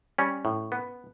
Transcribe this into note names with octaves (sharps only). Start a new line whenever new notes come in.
G3 C#4
A2
B3